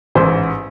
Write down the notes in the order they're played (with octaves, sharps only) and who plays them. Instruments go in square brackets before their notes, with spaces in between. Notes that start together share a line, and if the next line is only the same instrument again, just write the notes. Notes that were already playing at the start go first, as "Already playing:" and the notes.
[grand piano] A1 G#2 E3 G#3 [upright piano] C5